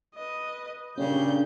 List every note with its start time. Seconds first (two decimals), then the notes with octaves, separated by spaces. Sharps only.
0.15 B4 D#5
0.98 G2 A#2 C#3 G3 C#4 D4 G6